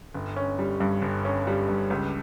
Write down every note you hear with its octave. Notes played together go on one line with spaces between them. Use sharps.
G1
C#4
G3
G2
G1
C#4
G3
G2
C#2